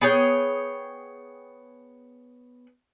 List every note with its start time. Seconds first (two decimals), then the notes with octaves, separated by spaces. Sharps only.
0.01 B3 G#4 C#5 G5